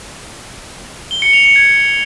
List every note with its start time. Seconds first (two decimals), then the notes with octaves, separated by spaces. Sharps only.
1.11 G7
1.22 C#7
1.33 F7
1.45 C#7
1.56 G#6